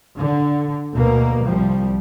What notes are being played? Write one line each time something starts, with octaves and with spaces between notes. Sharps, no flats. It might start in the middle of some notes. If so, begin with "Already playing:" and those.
D3
D2 B2 A#3
C2 F3 G3